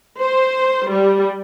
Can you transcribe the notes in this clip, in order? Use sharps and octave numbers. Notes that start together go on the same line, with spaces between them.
C5
G3